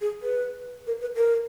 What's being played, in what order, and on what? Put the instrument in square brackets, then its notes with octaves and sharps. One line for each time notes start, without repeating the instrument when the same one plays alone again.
[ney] G#4
B4
A#4
B4
A#4